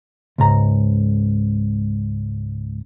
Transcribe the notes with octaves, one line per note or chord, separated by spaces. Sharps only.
C#2 G#2 A#5